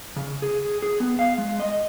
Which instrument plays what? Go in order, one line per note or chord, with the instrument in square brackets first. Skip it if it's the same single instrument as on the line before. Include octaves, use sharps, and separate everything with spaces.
[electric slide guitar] C#3
G#4
G#4
B3
F5
G#3
D#5